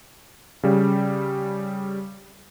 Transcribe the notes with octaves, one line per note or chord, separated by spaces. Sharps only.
C#3 G3